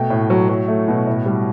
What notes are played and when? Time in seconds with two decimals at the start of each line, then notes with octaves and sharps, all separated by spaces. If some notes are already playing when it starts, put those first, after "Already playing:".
Already playing: B2 A3 G5
0.10 A2
0.30 F#3
0.49 F#3
0.68 A3
0.88 B2
1.07 A2
1.26 G3